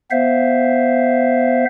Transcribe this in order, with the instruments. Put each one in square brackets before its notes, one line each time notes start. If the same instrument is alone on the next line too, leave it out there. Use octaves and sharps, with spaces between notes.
[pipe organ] B3 C5 E5 F5